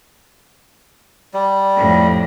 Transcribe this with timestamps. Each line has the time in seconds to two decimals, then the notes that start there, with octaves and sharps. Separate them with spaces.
1.34 G3
1.76 F2 A2